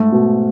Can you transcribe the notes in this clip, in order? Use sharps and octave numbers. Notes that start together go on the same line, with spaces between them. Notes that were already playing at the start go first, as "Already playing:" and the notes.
Already playing: G#2 A3
B2